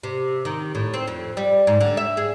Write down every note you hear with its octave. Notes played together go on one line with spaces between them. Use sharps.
C3
D#3
A2
C4
F2
G3
G#2
D3
E5
G#4